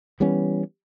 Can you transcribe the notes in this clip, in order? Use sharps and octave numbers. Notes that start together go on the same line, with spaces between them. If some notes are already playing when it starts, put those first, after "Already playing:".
E3 G3 B3 C#4